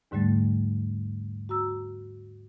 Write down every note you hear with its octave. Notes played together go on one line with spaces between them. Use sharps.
D#2 G#2 D3 G3 A3 A6
F#4 A#5 E6